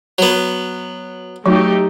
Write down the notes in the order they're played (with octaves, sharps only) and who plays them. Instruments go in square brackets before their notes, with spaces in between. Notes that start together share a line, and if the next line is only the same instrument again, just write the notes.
[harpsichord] F#3 B3
[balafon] F#3 F#4 [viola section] A3 D#4 G4